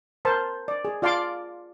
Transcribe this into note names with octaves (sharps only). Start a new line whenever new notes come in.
A#4 C5 A5
D5
G#4
F4 D5 F5 A5 C6 D6